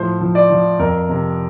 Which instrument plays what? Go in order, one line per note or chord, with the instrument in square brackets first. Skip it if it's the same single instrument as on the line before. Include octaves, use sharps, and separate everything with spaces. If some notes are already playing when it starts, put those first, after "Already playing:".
Already playing: [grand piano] A2 F3 C5
F3
D5
F3
F2 A#4
C3